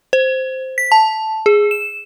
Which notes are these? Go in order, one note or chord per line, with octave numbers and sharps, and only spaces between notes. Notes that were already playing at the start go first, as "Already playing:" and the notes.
C5
B6
A5
G#4
E7